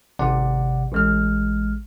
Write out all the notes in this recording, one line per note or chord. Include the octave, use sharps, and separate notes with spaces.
G#1 C3 D5 F#5
A1 G#3 F6